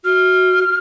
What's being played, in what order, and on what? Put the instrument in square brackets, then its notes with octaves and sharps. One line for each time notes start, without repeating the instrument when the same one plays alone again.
[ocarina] F#4 [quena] F6